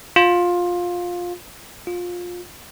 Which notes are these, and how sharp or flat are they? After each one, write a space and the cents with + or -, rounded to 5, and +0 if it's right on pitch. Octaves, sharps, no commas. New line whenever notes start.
F4 +15
F4 +20